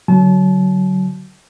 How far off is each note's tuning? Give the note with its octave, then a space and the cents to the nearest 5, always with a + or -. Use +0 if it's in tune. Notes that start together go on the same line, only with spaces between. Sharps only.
D3 -30 F#3 +15 A5 -35